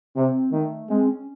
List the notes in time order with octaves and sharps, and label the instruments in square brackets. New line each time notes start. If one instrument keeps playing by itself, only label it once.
[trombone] C3 [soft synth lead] C4
[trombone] D#3 [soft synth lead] A3
[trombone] G#3 [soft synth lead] C4
[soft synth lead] C#4